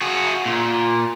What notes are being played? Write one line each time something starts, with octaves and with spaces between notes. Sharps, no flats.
F#4 G#4
A#2